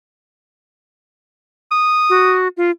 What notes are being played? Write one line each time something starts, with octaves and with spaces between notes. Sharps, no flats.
D#6
F#4
F4